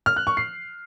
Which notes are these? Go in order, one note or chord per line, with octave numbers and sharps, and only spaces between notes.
F6
F#6
C#6
C7